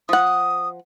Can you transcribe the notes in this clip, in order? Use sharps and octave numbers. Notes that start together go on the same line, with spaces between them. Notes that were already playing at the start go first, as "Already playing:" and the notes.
F3 F#5 D#6